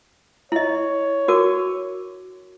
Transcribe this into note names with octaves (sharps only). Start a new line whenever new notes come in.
E4 C#5 D#5
F#4 A#4 D6